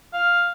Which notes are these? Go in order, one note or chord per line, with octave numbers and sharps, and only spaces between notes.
F5